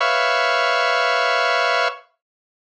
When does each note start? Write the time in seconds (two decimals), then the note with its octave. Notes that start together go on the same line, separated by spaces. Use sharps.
0.01 B4 C#5 E5 F5 C#6